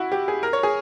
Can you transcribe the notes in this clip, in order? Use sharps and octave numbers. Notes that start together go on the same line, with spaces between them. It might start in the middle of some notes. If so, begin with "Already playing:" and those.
Already playing: E4 F#4
G4
G#4
A#4
C#5
G#4